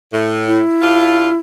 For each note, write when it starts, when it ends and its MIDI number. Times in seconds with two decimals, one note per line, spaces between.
0.13 0.60 45
0.48 1.37 64
0.81 1.29 43
0.81 1.29 62
0.81 1.29 65